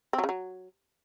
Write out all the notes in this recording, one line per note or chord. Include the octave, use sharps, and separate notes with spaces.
C4
F#3
C#3
F#3